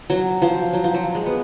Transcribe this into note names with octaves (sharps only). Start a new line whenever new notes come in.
F#3
F3
F#3
F3
F#3
G#3
B3